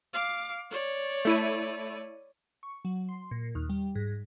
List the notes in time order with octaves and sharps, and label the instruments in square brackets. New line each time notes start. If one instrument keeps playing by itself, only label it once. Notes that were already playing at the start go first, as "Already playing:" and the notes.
[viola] F5 D6
C#5 D5
[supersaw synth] A3 E4 D#7
[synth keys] C#6
F#3
C6
A#2
D#2
G3
G#2